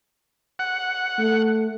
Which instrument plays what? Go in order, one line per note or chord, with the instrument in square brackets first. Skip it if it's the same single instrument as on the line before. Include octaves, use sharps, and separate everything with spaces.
[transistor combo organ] F#5
[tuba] A3